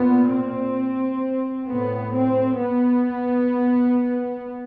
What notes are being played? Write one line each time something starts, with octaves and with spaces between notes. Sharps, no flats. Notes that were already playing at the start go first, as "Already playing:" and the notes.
Already playing: A#2 B3
C4
A2 B3
C4
B3